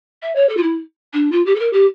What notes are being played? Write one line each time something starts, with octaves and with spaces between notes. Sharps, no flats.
E5
C#5
A4
F4
E4
D4
F4
G4
A4
A#4
G4